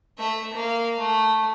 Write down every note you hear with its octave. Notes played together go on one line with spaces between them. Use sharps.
A3 E5
A#3 F5
A3